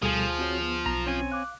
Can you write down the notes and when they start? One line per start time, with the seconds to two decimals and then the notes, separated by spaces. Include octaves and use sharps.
0.02 D2 B2 F3 G3 G#4 A4 G#5
0.39 C4 F#4 C#5
0.62 B3
0.86 B1 A#5
1.07 C4 C#4 C#5 G#5
1.31 F5 D6 F#6